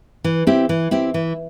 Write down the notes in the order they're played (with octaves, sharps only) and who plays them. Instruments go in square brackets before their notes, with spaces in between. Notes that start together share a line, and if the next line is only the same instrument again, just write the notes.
[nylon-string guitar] E3
C4 E4 G4
E3
C4 E4 G4
E3